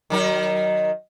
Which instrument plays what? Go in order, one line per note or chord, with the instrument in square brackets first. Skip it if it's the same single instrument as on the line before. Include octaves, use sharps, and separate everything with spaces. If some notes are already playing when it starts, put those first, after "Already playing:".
[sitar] D#3 F#3 A#4